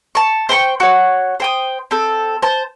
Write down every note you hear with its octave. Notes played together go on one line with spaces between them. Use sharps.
A5 C#6
C5 G5 B5 C#6
F#4 C#5
C5 G5 D#6
C4 A4
C5 A5